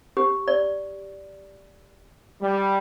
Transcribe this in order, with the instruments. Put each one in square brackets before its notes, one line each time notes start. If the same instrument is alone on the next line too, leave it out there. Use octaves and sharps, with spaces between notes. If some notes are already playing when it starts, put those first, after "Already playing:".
[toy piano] G4
D5
[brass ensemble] G3